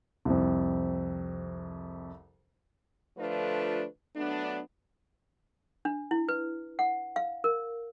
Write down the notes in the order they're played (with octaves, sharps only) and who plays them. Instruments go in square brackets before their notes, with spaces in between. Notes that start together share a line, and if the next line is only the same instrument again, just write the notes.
[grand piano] C2 F2
[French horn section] D3 F3 A3 D4 F4 B4
F#3 A3 B3 D4
[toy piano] D4
E4
B4
F#5
F5
A#4